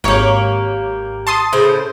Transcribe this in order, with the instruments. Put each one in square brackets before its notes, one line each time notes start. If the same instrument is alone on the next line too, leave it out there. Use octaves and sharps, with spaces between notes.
[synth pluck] G#1 C#5 C#6 [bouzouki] A#3 G4
[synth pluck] A5 C6 D#6
[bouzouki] A2 C#3 C5